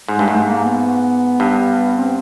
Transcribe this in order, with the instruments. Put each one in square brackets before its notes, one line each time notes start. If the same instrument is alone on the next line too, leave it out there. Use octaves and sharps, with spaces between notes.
[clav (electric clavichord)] G#2 [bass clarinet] G#3
[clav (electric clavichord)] G2
[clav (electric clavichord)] G#2 [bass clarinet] A3
[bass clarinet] A#3
B3
[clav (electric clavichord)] G2
[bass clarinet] C4